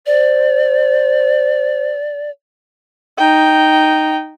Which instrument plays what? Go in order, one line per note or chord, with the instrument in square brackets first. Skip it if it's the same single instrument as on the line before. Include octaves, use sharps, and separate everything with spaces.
[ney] C5 [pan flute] D5
[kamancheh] D#4 G5